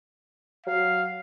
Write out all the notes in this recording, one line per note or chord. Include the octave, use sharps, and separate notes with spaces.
F#3 F5